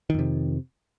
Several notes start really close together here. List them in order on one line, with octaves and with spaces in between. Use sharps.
D#3 F2 C3